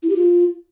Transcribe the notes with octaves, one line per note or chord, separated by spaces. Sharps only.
E4
G4
F4